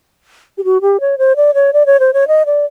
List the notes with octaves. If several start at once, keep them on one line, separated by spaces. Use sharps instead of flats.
G4
F#4
G4
C#5
C5
D5
C#5
D5
C#5
C5
C#5
D#5
D5